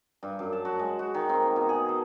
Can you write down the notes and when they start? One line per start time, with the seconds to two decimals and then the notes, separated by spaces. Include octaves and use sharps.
0.23 G2
0.39 F#2
0.53 A5
0.65 F#4
0.79 G#3
0.99 F#4
1.14 D#3
1.29 C4
1.43 A#3
1.56 B2
1.69 G#4
1.89 A4